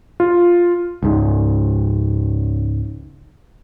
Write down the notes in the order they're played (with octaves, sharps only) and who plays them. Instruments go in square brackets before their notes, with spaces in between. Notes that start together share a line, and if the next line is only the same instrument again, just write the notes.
[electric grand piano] F4
[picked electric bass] C#2 G#2